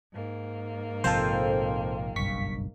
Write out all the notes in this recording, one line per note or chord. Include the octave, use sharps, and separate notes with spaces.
G#2 A#3
A#1 C3 F3 C4 F4 A4 C5 A5
F#1 B1 G2 C#6 B6